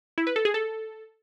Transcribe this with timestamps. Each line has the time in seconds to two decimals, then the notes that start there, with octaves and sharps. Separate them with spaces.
0.18 E4
0.27 B4
0.36 A4
0.45 G#4
0.54 A4